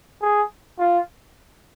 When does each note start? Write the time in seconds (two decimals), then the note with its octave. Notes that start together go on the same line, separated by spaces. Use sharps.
0.22 G#4
0.79 F4